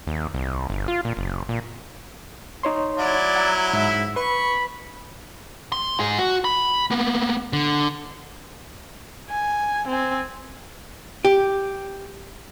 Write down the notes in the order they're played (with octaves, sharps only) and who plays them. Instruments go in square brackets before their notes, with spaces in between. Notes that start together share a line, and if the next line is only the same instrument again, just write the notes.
[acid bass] D#2
C2
G1
F4
A#2
F#1
A#2
[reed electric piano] D#4 C#5 C6
[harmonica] F#3 E4 [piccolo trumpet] D5
[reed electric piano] F#5 A#5 E6
[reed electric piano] G#2 [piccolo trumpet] E5
[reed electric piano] B4 [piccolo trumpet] B5 [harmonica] C#6
[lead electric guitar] C6
G#2 G#4
F#4
B5
A#3 B3
D3
[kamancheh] G#5
C4 G#5
[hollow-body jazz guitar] G4